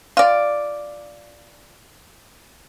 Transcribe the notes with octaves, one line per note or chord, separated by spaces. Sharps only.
F4 D5